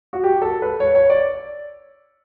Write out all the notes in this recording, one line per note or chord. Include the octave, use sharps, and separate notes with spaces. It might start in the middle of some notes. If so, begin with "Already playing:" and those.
F#4
G4
A4
B4
C#5
C#5
D5